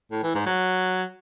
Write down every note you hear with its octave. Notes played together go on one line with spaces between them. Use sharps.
A2
E3
G#2
F#3